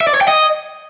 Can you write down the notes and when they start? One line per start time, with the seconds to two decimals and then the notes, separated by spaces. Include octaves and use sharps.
0.01 E5
0.07 D5
0.14 C#5
0.21 G5
0.28 D#5